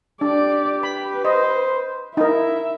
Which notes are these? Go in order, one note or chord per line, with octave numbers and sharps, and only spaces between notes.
D4 G4 D5
B4 B5
C5 D#5
D#4 E4 A#4 E5